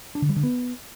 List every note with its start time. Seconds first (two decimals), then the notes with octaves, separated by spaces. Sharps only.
0.15 D4
0.22 D3
0.29 G3
0.36 D3
0.43 B3